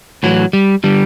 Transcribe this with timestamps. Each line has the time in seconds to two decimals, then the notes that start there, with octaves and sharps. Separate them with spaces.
0.23 A2 E3 F#3
0.53 G3
0.84 D3 G3